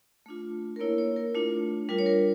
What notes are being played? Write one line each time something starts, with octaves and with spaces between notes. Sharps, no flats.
A3 D4 F4
A#4
A#3 E4 C#5
C#5
A#4
A3 D4 F4
G3 D4 F4 A#4
C#5
A#4